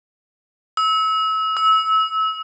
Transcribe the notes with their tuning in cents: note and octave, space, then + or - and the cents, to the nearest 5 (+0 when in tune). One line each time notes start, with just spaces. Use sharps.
E6 -30
E6 -25